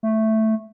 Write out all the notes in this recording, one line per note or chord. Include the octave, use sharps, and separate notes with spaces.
A3